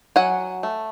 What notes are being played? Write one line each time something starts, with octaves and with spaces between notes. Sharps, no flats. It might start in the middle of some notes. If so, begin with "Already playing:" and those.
F#3 F#5 G#5
A3